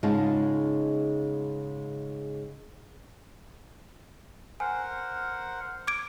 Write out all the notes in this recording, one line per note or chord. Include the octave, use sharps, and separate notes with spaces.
G#2 C#3 G#3 D#4 F4 A5
A#4 C5 F#5 G#5
D6 G#6 D7